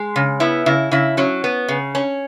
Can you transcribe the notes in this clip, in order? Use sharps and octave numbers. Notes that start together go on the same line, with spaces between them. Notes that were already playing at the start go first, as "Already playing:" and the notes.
Already playing: G#3
C#3
B3 E4
C#3 E4
C#3 E4
F#3 C#4
B3
C#3
C#4